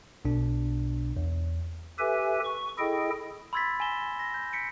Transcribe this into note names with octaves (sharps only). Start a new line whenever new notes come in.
B1 B2 D4
E2
G4 A4 B4 E5 G#5
C#6
E4 G#4 A4 D#5 G5
B5 C6 E6 G#6 A6 B6
G#5 A#6 E7 G7
A#6
G6
B6 C#7 D7